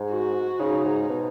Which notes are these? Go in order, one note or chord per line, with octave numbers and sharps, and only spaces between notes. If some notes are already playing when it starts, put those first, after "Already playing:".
Already playing: G#2
F#4
C#3 D#4
G#2
B2